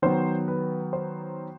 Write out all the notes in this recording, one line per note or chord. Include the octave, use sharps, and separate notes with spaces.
D#3 F#3 B3 C5
B4
C5